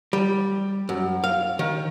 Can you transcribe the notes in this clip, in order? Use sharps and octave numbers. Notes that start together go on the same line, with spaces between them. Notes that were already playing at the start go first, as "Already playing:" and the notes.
G3
F#2
F5
D#3